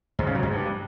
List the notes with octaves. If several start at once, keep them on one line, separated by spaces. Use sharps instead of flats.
G#2
C#3
F#3
G#2
G2